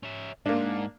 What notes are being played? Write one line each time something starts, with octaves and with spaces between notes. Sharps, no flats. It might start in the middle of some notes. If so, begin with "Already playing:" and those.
C#4 E5
G#2 A#3 D4